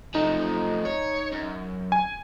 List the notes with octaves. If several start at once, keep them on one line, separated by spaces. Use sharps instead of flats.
F3 A3 D#4
C#5
F#2
G#5